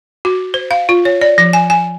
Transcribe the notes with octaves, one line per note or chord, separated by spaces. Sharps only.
F#4
C5
F5
F4
C#5
D5
F3
G#5
G#5